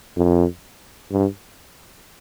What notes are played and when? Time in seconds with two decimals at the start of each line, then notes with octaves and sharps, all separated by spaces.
0.16 F2
1.11 G2